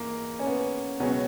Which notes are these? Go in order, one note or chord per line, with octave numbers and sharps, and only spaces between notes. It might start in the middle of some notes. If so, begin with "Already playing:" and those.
Already playing: G#2 E3 A#3
C#4
B3
C#2 B2 F#3 B3 C#4 F#4